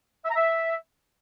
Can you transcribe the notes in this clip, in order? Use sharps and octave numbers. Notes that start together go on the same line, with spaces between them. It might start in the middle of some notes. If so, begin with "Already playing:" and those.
E5
A#5
E5